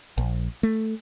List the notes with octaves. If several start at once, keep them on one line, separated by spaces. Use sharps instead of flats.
A#1
A3